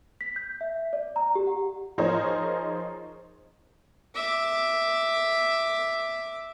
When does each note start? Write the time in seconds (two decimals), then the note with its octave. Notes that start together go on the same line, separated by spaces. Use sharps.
0.21 B6
0.36 G6
0.61 E5
0.93 D5
1.16 A#5
1.35 G4
1.47 F#5
1.98 F3 D#4 G#4 A#4 C5 C#5
4.15 E5 D6